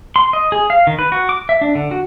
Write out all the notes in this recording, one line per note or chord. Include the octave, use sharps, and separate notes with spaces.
C6
D#5
G#4
F5
D#3
B4
F#4
D6
E5
D4
D3
F#4